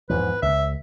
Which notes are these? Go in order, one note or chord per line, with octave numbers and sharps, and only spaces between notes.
E2 G#2 F3 B4
C#2 E5